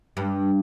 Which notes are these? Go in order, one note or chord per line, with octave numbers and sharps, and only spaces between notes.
G2